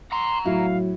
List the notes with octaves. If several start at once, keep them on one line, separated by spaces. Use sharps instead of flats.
F#5 A#5 C6
A2 F#3 E4 F#4 F5